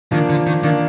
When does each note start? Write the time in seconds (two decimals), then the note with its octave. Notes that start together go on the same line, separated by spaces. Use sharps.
0.12 D#3 F3 A#3 D4
0.30 D3
0.47 D#3
0.64 D#3 F3 A#3 D4